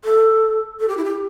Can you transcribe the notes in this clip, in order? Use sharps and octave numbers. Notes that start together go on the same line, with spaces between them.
A4
A4
G4
E4
G4